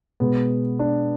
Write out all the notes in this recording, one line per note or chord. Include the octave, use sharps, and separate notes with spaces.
B2 G#3 B3
D4